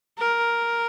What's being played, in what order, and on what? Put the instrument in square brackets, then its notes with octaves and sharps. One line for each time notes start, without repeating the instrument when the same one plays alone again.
[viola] A#4